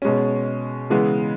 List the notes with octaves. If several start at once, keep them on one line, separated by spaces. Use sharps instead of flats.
B2 G#3 C#4
C#3 E3 G#3 B3